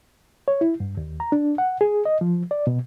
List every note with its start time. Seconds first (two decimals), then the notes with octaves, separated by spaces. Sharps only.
0.48 C#5
0.61 E4
0.80 G2
0.97 D#2
1.20 A#5
1.32 D4
1.58 F#5
1.81 G#4
2.06 D#5
2.21 F3
2.51 D5
2.67 B2